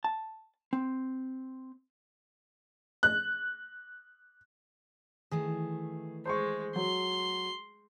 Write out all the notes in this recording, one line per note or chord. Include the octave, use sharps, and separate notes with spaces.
A5
C4
F#6
D#3 E3 A3 G#4
G#3 C5 C6 C#6
F#3 C6